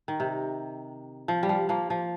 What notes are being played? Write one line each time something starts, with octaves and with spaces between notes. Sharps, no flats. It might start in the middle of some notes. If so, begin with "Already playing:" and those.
D#3
C3
F3
G3
F3
F3 A#3
F3